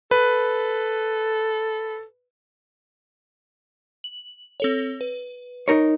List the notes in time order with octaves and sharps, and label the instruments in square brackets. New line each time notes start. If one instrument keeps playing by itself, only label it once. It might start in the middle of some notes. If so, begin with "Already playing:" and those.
[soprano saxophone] A4 [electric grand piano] B4
[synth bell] F#7
C4 A4 C#5
B4
[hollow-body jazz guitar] D#4 A#4 C#5